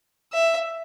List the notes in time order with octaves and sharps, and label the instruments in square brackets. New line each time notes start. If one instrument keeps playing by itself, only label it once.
[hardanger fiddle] E5